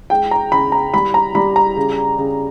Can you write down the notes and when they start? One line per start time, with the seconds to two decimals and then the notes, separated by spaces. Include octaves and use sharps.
0.10 G#3 G5
0.31 A#5
0.52 C#3 B5
0.72 A#5
0.94 G3 B5
1.14 A#5
1.35 G3 B5
1.56 A#5
1.76 C#3
2.18 C#3